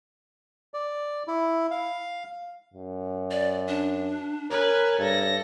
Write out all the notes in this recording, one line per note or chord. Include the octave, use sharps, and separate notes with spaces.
D5
E4
F5
F#2
D5
D4
A#4 B4 C#5 G#5
G2 A4 A#6